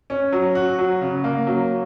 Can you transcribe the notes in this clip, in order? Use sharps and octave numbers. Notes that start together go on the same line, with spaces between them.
C#4
F#3
F#4
F#3
C#3
A#3
F#3